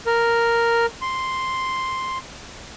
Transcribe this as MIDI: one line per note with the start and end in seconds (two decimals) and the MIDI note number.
0.06 0.86 70
1.02 2.18 84